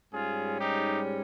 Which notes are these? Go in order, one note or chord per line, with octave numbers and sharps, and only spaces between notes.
G#2 G3 C#4 F4 G#4
D#4 G4